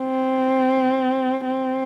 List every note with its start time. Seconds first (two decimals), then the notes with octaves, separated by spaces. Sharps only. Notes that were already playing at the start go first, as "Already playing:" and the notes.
Already playing: C4
1.46 C4